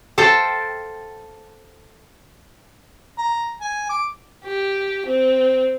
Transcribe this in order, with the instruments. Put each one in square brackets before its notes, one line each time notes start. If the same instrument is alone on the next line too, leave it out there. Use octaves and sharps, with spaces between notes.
[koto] A4 C5 F5 G5 A5
[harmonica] A#5
G#5
D6
[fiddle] G4
C4